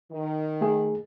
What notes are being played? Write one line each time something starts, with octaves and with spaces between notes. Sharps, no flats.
D#3
A3 G#4